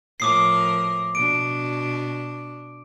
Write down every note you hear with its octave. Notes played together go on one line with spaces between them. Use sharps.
A2 F3 A#4 D6 D#6 C7
B2 D4 D7